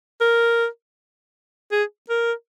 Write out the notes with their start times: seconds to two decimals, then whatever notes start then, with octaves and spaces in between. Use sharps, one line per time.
0.21 A#4
1.72 G#4
2.10 A#4